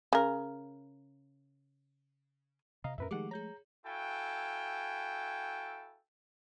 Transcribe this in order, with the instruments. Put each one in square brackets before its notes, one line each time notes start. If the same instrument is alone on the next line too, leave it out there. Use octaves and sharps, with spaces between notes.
[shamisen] C#3 A#4
[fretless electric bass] C3 [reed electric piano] D#5 F5 A#5
[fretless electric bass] F2 A2 C#4 [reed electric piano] A#4 B4 E5
[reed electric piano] D#3 F#5 D6 [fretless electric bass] F3 G#3 A3 [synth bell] G4 G#4
[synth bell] G#4 C#5 [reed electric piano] A#5 G6
[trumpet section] E4 F#4 A4 F5 G5 G#5